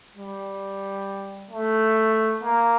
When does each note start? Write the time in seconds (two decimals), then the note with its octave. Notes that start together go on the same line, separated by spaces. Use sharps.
0.15 G3
1.51 A3
2.43 A#3